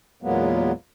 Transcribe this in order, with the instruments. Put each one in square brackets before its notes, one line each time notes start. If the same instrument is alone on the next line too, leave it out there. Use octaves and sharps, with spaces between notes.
[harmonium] E2 A#2 F#3 G#3 A#3 B3